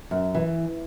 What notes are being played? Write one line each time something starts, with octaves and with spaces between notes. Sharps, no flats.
F#2
E3